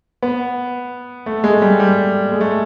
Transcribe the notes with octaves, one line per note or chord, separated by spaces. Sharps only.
B3
A3
G#3
G3
G3
G#3
A3